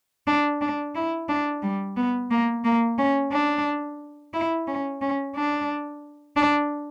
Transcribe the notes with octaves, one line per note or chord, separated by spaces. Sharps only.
D4
D4
E4
D4
G3
B3
A#3
A#3
C#4
D4
E4
C#4
C#4
D4
D4